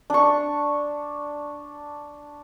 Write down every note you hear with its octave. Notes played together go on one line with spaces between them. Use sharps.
D4 C#6